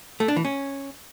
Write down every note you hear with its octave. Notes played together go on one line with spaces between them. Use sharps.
A3
D4
E3
C#4